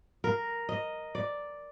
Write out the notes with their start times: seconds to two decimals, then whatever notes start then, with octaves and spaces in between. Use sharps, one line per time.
0.24 A#4
0.69 D#5
1.15 D5